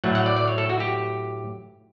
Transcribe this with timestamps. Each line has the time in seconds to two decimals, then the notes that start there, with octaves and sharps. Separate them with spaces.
0.04 A2 F#3 A3 F#5
0.15 F#5
0.26 D5
0.36 D5
0.48 C#5
0.58 A4
0.70 F#4
0.80 G4